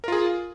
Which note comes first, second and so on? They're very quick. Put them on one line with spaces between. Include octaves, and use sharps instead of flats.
A#4 F4 G#4